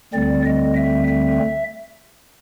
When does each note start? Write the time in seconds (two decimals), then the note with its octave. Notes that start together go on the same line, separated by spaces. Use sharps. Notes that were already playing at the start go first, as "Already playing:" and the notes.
0.13 D2 D3 G3 C4 D5
0.45 D#5
0.76 E5
1.08 E5